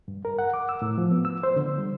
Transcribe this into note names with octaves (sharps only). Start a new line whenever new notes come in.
G2
A#4
F#5
D6
E6
A2
F3
B3
E6
C5
D3
G3